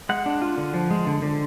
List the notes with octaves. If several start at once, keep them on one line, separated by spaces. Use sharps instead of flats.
G#3 F#5
D4
F4
D3
F3
G#3
D3
D3